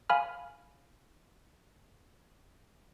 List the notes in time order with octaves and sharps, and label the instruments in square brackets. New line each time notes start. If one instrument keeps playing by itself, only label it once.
[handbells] F5 G#5 B5 F6